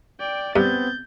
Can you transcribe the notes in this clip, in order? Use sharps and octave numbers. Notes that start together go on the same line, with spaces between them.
D5 G5
G2 B3 C4 G6 A6